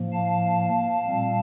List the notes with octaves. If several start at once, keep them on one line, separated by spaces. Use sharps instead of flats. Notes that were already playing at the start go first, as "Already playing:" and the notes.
Already playing: A2 F3 A#3
F5 A5
A#2 G3 C4